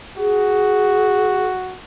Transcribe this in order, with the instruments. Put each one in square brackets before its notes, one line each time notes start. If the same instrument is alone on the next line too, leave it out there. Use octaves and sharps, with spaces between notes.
[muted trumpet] F#4 [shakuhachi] G#4